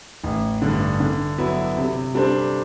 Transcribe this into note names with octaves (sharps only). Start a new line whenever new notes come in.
A1
G2 D3
D3
F#3 B3 E4
C3
G3 D4 A4 C5